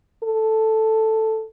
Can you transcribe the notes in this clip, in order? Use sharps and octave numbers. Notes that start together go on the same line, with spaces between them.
A4